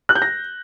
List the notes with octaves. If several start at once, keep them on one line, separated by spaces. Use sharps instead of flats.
F#6
G6
A#6